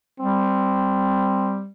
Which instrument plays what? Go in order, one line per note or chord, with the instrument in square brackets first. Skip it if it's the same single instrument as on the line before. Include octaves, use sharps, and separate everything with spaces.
[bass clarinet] G3 [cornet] C4